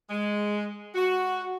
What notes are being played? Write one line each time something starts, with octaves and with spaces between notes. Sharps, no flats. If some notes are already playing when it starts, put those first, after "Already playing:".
G#3
F#4